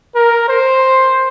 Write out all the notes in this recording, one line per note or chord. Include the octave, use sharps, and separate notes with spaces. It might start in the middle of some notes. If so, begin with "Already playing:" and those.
A#4
C5